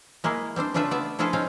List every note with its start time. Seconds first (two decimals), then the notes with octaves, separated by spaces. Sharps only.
0.24 G#3 A#3 E4 G#4
0.56 G3 C4 D4 C5
0.74 C#3 A3 D4 F4 B4 E5
0.91 B3 D5 E5
1.19 F3 D4 E4 F4 G#4 A4
1.33 G#3 C4 C#4 F5